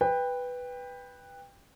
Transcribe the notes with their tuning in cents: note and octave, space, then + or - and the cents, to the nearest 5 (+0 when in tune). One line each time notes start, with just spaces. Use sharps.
B4 +0 G5 +20